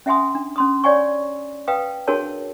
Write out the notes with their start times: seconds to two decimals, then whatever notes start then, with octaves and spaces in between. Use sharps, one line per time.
0.06 C#4 E5 F#5 G#5 C6 D#6
0.35 D4
0.56 C#4 C6 D#6
0.84 C#5 D5 F#5 G#5 C#6
1.68 B4 F5 G5 D#6
2.08 D4 F#4 G#4 A#4 C#5 A5